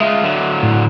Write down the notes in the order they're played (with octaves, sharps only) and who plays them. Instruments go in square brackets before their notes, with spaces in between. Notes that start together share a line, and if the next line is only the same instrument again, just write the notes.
[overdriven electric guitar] G#3 F4 [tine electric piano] E5
[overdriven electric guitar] D3 F#3
[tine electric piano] A2